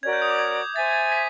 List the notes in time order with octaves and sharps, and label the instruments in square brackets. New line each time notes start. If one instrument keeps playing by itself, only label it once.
[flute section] C#4 F#4 A#4 D5 [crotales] G#6
[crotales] G6
D#6
D6
G#6
[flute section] C5 E5 G#5 [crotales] A6
[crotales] A6
B6